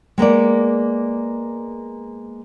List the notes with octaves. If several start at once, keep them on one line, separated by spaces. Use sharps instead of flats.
G#3 A#3 B3 D5